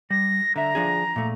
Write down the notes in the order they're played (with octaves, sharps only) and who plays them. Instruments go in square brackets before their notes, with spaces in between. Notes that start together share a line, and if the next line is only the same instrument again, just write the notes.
[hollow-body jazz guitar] G3 [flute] A#6
[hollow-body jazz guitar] D3 E5 [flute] A#5
[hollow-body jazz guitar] F3 D4 G#4
A#2 A3